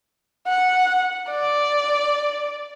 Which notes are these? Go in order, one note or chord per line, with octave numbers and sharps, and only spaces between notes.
F#5
D5